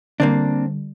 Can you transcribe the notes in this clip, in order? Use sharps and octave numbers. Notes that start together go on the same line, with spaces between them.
D3 G3 A#3 C4 D4